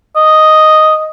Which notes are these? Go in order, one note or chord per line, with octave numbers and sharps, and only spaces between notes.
D#5